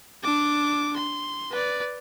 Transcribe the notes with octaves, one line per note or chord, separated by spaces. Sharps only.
D4 D6
C6
B4 D5